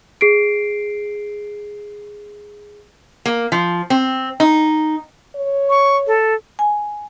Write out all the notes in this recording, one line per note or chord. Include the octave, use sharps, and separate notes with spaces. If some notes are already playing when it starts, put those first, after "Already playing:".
G#4 C7 D7
A#3
F3
C4
D#4
C#5
C#6
A4
G#5